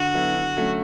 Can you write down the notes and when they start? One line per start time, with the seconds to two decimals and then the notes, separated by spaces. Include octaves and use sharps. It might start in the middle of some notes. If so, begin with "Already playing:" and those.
Already playing: D3 F#4
0.14 F#3 B3 E4 A4
0.35 D3
0.57 F#3 A3 C#4